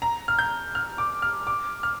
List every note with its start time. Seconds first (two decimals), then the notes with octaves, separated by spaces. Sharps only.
0.02 A#5
0.28 F6
0.39 G6
0.75 F6
0.98 D6
1.22 F6
1.47 D6
1.83 F6